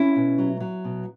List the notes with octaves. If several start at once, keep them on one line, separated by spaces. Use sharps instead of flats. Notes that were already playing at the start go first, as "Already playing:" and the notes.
Already playing: C#4 E4
B2
F#3
F#3
B2